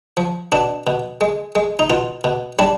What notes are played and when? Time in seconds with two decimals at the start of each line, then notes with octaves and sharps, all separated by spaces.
0.17 F3
0.52 B2 D4
0.87 B2
1.21 G#3
1.55 G#3
1.79 D#4
1.90 B2 F4
2.24 B2
2.59 G3 D4